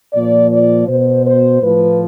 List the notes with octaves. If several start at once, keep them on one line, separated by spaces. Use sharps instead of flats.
A#2 F3 D5
D5
B2 C5
C5
A2 F3 B4